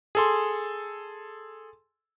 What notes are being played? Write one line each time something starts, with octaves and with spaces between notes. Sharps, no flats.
G#4 A4 C6